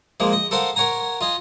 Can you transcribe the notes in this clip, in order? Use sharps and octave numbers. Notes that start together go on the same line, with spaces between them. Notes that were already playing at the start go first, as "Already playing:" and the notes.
F3 G#3 A#3
D#5
A4 A#4 C5 F5 F#5
A#4 C#5 F#5 G#5 A#5
F4 D#5 G#5